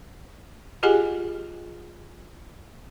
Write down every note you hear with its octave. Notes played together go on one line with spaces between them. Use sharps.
F4 G4 G#4 D#5 F#5 G#5